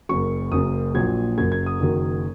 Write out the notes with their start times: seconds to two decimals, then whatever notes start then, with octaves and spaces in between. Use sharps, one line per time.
0.09 F#1 F#2 F#3 C#6
0.52 F#1 F#2 C#3 D#6
0.95 A#1 A#2 F#3 G#6
1.38 F#1 F#2 F#3 G#6
1.52 G#6
1.66 D#6
1.80 F#1 F#2 D#3 F#3